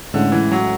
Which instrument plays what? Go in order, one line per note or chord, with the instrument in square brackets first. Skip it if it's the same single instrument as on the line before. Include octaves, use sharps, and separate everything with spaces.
[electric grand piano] A2 G#3 C#4 [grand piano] D3
[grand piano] E3
F#3